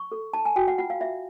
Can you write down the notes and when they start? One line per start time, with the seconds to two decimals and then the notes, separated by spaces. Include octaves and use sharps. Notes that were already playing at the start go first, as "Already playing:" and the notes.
Already playing: C#6
0.12 A4
0.33 D#4 A5
0.45 G#5
0.56 F#4 G5
0.68 F#5
0.78 F4 F#5
0.90 F5
1.01 F4 E5